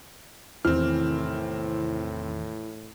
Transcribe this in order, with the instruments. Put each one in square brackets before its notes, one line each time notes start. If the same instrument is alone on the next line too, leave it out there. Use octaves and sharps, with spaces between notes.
[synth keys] E2 C3 D#3 [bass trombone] A2 [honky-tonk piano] E3 [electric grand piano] C4 F6